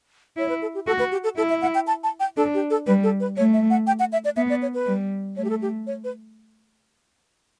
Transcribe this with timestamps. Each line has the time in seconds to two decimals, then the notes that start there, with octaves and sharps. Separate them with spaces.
0.37 E4 C#5
0.49 B4
0.62 A4
0.75 G4
0.87 F#4 A4
0.99 B4
1.12 G4
1.24 A4
1.37 E4 A4
1.49 E5
1.62 F#5
1.75 G5
1.87 A5
2.04 A5
2.20 G5
2.37 D4 A4
2.54 G4
2.70 A4
2.87 G3 B4
3.03 A4
3.20 B4
3.37 A3 C#5
3.53 E5
3.70 F#5
3.87 G5
4.00 F#5
4.13 E5
4.25 D5
4.37 B3 E5
4.50 D5
4.62 C#5
4.74 B4
4.87 G3
5.37 A3 C#5
5.45 G4
5.50 A4
5.62 G4
5.87 C#5
6.04 B4